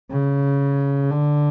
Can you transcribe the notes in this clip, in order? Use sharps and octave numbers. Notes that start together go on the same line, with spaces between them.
C#3
D3